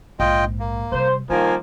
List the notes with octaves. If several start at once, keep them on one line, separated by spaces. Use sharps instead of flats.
A#1 G#2 F4 D#5 G5
A#3
C3 G3 C5
D#3 F3 G3 A#3 G#5